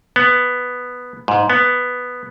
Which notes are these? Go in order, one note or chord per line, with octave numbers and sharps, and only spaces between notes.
B3
G#2
B3